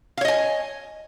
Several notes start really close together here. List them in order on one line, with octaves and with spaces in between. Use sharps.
F5 C#5 D#5 G#5